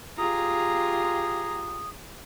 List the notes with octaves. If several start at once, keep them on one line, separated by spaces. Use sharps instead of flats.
F4 G4 G#4 A#5 D#6